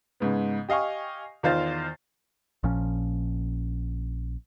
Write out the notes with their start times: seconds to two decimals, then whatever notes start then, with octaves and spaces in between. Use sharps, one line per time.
0.20 G#2 C#3 B3
0.69 G4 D#5 F5 G#5 C#6
1.43 E2 D#3 F4 C5 F5 A6
2.63 A#1 A#2 F3 C#4